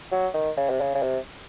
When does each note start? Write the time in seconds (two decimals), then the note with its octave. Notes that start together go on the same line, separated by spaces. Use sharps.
0.12 F#3
0.34 D#3
0.57 C#3
0.70 C3
0.81 C#3
0.95 C#3
1.02 C3